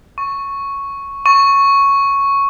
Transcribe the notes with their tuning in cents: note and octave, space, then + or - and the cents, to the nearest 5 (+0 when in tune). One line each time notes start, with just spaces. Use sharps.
C#6 +0
C#6 +0